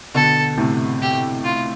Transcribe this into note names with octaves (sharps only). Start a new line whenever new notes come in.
B2 D3 A4
A2 C3
G4
F4